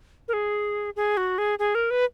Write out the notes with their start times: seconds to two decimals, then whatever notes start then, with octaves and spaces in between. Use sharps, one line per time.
0.28 A#4
0.33 G#4
0.96 G#4
1.17 F#4
1.38 G#4
1.59 G#4
1.75 A#4
1.91 B4